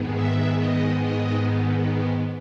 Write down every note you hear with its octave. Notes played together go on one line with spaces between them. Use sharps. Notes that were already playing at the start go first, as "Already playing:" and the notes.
Already playing: G#2 D#3 G#3 B3
E5
D#5
D#5